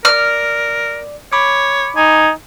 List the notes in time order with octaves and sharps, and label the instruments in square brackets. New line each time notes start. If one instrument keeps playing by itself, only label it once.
[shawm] A#4 [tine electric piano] D5 [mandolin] F6
[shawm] C#5 [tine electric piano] B5 D6
[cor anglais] D#4 [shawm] G#5